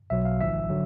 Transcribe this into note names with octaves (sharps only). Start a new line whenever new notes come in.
B1 B2 F#3 E5
F5
G#1 G#2 F3 E5
D3 F#3